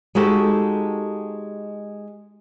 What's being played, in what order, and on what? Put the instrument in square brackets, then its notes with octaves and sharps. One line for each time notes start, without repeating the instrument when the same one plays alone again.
[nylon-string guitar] G#3 D#4 F#4 G4 A4